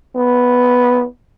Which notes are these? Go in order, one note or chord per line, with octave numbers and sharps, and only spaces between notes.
B3